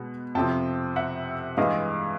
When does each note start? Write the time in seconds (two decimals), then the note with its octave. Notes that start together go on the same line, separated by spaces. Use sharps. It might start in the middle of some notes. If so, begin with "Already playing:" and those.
Already playing: B2 G#3 F#5
0.35 F2 C3 F3 G5 A5
0.96 E5 F#5
1.57 G2 E3 G#3 D#5 F5